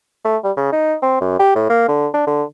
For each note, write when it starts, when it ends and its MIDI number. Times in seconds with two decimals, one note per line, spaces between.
0.25 0.37 57
0.44 0.52 55
0.57 0.72 49
0.72 0.95 63
1.02 1.20 60
1.21 1.34 42
1.39 1.53 67
1.55 1.68 45
1.70 1.87 58
1.88 2.07 50
2.14 2.23 62
2.27 2.43 50